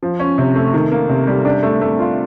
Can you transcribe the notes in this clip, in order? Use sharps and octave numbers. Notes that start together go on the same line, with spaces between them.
F3
C#4
C3
A3
D#3
A#3
C3
G3
D4
A3
A3
F4